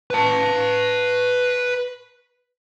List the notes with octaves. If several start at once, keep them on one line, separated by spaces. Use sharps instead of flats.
B4 A5